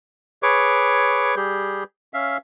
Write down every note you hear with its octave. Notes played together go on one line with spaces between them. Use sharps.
G#4 B4 C#5 C#6 D6
G3 G4 G#4 G6
C#4 E5 F5